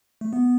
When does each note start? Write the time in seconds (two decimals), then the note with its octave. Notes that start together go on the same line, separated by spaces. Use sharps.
0.21 A3
0.33 B3